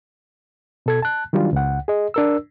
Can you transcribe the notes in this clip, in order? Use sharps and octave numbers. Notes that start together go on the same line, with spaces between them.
B2 A4 G#6
A5 F#6
D#3 F#3 G3 D4 F4
C#2 F#5
G#4 D#5
D4 A#4 E6